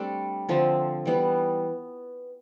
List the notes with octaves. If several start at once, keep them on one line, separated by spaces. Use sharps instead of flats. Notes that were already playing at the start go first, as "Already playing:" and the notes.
Already playing: G3 A3 C4 D4 A4
D3 F3 C4
E3 G3 B3